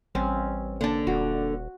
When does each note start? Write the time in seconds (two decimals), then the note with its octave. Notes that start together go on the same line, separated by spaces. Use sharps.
0.15 A1 G3 C4 C#4
0.81 D3 A#3 D4
1.07 D#1 F#4